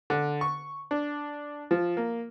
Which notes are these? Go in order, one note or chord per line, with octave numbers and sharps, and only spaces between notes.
D3
C#6
D4
F3
A#3